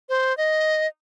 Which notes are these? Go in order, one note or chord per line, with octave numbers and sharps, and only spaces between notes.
C5
D#5